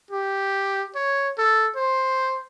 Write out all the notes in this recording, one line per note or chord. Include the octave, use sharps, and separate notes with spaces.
G4
C#5
A4
C5